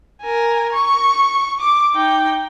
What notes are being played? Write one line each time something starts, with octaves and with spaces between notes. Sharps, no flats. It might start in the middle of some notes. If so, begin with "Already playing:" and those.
A#4 G#5
C#6
D6
D#4 G5